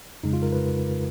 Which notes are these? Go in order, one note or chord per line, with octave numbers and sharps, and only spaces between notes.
F2 C#3 G#3 D#4
F4
A#4
B4